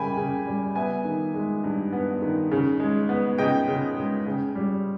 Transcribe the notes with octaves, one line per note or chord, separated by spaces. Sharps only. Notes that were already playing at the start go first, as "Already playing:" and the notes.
Already playing: C#3 G3 A#3 G5 G#5 B5
C#3
G3
B3 E5 G#5
D#3
G#3
G2
B3
D#3
C#3
G#3
B3
C#3 D#5 G5
C#3
G#3
C#3
G3